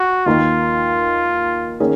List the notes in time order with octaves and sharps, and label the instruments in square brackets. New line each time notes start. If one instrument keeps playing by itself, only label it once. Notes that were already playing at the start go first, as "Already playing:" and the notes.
Already playing: [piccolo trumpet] F#4
[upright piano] D#2 D#3 A#3 D#4 A#4 [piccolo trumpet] F4
[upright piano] D#3 A#3 C#4 G#4